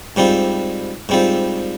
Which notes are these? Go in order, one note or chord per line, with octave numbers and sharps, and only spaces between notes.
G#2 G3 C4 F4
G#2 G3 C4 F4